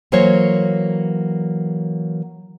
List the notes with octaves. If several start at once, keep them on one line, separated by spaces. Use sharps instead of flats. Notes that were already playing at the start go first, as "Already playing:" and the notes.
E3 F#3 A#3 C5 C#5